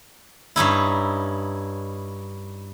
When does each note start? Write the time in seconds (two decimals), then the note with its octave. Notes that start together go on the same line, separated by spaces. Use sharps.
0.56 G2 C#4 D#4 E4